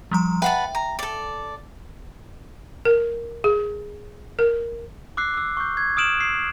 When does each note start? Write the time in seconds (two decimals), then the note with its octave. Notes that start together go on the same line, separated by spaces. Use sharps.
0.11 F3 G3 A#5
0.42 B4 E5 F#5 G5 A5
0.75 A#5
0.99 A4 D5
2.85 A#4
3.44 G#4
4.39 A#4
5.17 D6 E6 F#6 C7
5.34 D6 E6
5.57 C#6 G6
5.77 G#6
5.97 D#6 F6 D7 E7 F#7
6.20 C7